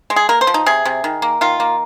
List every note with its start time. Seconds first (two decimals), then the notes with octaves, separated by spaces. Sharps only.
0.10 G#3
0.16 G#4
0.29 A#3 A#4
0.41 C5
0.47 F3
0.54 D#4
0.66 C3 G#4
0.85 C3
1.04 D#3
1.22 A#3
1.41 D#3 F4
1.60 A#3